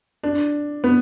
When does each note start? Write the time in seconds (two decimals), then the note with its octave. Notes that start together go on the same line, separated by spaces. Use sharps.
0.23 D4
0.84 B3